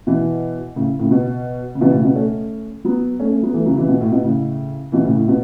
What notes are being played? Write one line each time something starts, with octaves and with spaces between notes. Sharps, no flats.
B2 E3
A2 C#3
A2 C#3
B2
C#3
B2 E3
A2 C#3
B2
A3 C#4
F#3 B3
A3 C#4
A3 C#4
F#3 B3
E3 A3
C#3 F#3
B2 E3
B2
A2
B2
A2 C#3
B2 E3
A2 C#3
A2
B2